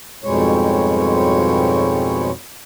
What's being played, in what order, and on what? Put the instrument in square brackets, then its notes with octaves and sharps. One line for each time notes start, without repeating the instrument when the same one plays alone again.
[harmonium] F2 G#2 B2 G3 G#3 C#5